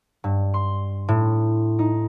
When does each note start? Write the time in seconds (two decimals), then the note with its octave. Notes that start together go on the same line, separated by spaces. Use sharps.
0.24 G2
0.54 C6
1.08 A2
1.79 D#4